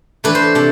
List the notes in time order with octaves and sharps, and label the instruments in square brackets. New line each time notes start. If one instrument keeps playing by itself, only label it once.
[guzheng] E3 A3 D4 B4
C5
C3 A5